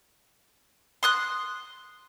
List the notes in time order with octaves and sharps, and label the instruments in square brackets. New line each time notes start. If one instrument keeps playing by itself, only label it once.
[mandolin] C6 D#6 F#6